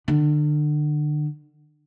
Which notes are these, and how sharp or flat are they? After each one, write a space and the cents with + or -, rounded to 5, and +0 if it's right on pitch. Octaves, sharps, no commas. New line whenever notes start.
D3 +30